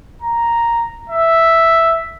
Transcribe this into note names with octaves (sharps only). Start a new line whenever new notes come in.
A#5
E5